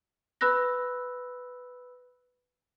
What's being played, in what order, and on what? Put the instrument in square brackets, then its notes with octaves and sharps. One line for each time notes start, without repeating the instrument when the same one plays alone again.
[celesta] B4 B5 E6 F#6 A#6